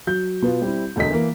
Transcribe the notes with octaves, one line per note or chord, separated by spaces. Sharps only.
F#3 G6
B2 B3 F4
G3 C4 E4
E1 D2 D#5 B6
E3 A#3